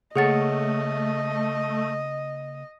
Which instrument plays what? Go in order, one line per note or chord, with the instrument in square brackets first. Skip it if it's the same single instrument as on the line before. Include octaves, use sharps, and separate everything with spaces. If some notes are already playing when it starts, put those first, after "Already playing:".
[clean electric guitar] C#3 A#3 C#5 [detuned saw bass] A3 [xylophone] G#4 F#5 A6 [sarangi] D#5